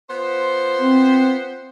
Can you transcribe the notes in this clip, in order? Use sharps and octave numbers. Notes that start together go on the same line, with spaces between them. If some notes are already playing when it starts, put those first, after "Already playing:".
B3 F4 C5
C4